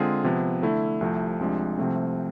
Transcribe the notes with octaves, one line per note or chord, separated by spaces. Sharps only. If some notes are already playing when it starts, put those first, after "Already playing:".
Already playing: D3 G#3 C4 F4 G#4
C3 F3 B3
D3 A3 E4
C2 C3 F3 A3
C2 C3 F3 G#3 D4
C2 C3 F3 A3 C4